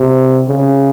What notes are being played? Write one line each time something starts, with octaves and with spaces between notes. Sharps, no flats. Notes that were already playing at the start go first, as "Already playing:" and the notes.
Already playing: C3
C#3